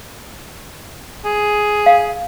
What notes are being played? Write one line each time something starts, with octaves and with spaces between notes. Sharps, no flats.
G#4
F5